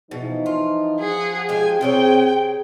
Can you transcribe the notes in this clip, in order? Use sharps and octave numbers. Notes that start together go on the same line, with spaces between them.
B2 E3 F3 D#4
F4
F3 G#4 F#5
G#3 G4 G#5
C3 C4 G#4 C#5 G5